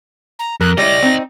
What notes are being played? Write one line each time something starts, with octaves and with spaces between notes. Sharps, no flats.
A#5
F2 A#4 F#6
G3 E4 C#5 D#5 A#6
C4 D#4